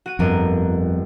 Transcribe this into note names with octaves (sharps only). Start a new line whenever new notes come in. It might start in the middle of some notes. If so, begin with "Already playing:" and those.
F#4 D#7
G1 F2 A#4 D#7